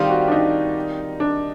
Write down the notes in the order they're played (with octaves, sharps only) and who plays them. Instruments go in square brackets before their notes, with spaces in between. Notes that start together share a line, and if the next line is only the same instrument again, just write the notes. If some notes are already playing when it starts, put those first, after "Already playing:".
Already playing: [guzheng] D#3 G3 C4 F4 [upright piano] G4
[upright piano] F#4
D4
D#4
D4